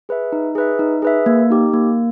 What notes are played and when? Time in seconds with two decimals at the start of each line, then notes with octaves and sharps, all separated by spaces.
0.09 G#4 B4 E5
0.32 D#4
0.55 G#4 B4 E5
0.79 D#4
1.02 G#4 B4 E5
1.26 A#3
1.50 D#4 G4
1.73 A#3